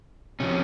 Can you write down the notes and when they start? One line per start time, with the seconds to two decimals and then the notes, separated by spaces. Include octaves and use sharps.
0.40 C3 F3 C#4